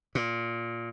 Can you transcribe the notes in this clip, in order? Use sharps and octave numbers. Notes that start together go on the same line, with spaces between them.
A#2